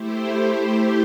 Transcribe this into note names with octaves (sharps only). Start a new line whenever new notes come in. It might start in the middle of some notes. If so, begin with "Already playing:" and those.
Already playing: A3 E4 G4 C5